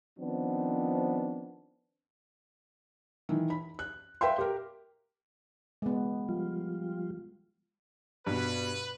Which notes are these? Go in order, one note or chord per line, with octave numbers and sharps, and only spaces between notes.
D#3 F3 B3 C4 D4
D#3 E3
B5
F#6
B4 E5 F5 G5 C6
G4 A#4
G#3 B3
F3 G3 F4
G2 B2 B4